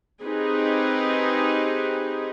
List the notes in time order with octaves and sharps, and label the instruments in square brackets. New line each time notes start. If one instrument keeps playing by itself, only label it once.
[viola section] C4 D#4 G4 G#4 B4